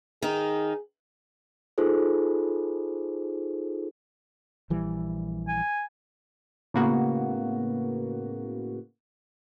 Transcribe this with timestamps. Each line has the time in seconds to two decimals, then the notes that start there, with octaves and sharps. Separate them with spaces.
0.22 D#3 D#4 G#4
1.78 D#4 F4 G#4 A4 C5
4.70 A#1 E3 G3
5.48 G#5
6.74 A2 C#3 A#3 B3 F#4